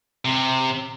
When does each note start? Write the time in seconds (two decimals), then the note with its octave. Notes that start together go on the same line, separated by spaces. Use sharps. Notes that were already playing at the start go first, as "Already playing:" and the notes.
0.25 C3